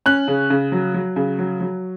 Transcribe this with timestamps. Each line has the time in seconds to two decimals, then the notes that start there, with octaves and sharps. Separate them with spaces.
0.06 C#4 F#6
0.28 C#3
0.50 C#3
0.72 F#3
0.94 F#3
1.16 C#3
1.39 F#3
1.61 F#3